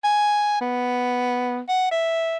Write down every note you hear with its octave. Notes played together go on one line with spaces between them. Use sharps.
G#5
B3
F#5
E5